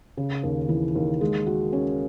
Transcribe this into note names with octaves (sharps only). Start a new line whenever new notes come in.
C#3
D#2
E3
D#2
G#3
F#4
C#4